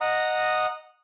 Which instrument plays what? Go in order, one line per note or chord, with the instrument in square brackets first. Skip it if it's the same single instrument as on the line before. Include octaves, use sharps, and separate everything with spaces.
[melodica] D#5 F#5 A#5 D#6